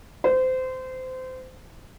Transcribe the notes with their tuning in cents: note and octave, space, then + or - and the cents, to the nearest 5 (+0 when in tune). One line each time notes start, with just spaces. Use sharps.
C5 -25